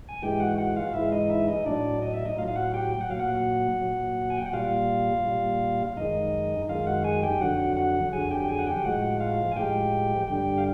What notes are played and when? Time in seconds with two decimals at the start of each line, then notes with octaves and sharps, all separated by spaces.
0.09 G#5
0.22 G#2 E3 G#3 G4 G5
0.40 F#4 F#5
0.58 F#4 F#5
0.76 F4 F5
0.94 G#2 E3 G#3 E4 E5
1.12 D#4 D#5
1.30 E4 E5
1.48 D#4 D#5
1.66 A2 F#3 D4 D5
2.02 D#5
2.14 E5
2.25 D#4 D#5
2.38 A2 F4 F5
2.42 F#3
2.48 F5
2.56 F#4 F#5
2.74 G4 G5
2.91 G5
3.01 F#5
3.10 A#2 F#3 F5
3.19 F#4 F#5
3.82 A#2 F#3
4.30 G#5
4.38 G5
4.46 F#5
4.53 A#2 G3 F4 F5
5.25 A#2 G3
5.97 F#2 D#3 G#3 D#4 D#5
6.69 F#2 D#3 G#3 F4 F5
6.87 F#4 F#5
7.04 G#4 G#5
7.23 G4 G5
7.41 F2 D3 F#3 F#4 F#5
7.77 F#4 F#5
8.12 F2 D3 F#3 G#4 G#5
8.31 G4 G5
8.41 G5
8.49 G#4 G#5
8.59 F#5
8.67 G4 G5
8.85 A2 F3 G#3 F#4 F#5
9.20 F4 F5
9.52 G#5
9.56 A2 F3 G#3 G4 G5
10.28 G2 D3 G3 G4 G5
10.58 F5